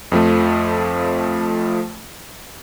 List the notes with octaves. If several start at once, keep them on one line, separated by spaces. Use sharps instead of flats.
F2 F3 A3